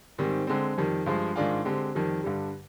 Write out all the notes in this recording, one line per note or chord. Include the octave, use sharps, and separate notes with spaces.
G#2 D#3 G3 C4
D3 G#3 C4
F2 D#3 G3
G2 F3 G#3
G#2 D#3 G#3 D4 F4
D3 G#3 C4 G4
F2 D#3 G3
G2 D3 G3